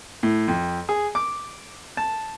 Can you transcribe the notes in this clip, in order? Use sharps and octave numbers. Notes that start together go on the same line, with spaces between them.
A2
F2
G#4
D6
A5